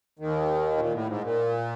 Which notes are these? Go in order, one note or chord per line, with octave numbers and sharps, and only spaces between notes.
D#2 D#3
A#2
A2
G#2
A#2